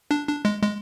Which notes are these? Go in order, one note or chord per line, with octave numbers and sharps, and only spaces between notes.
D4
D4
G#3
G#3